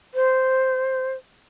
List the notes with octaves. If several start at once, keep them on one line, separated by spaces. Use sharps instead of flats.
C5